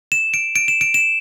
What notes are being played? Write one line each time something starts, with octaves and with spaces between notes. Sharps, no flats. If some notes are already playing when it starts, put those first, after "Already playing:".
E7
D7
D7
E7
D7
E7